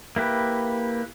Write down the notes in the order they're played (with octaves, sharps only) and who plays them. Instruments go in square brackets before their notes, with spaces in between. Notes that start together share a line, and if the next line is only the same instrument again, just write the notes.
[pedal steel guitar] A#3 E4 G4 B4